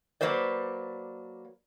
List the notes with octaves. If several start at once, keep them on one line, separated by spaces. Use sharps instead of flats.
F#3 A#3 B4 C5 D5